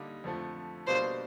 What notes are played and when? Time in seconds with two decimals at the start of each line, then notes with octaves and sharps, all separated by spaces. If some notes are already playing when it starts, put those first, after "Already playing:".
Already playing: D3 G3 A#3 D#4
0.24 F2 D3 F3 A3
0.87 B2 G3 A#3 D4 F4 C5